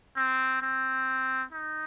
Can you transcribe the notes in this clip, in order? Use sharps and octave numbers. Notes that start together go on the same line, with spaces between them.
C4
C4
D#4